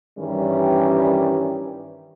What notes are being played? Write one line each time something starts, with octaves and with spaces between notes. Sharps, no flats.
G2 D#3 E3 G3 C#4 G4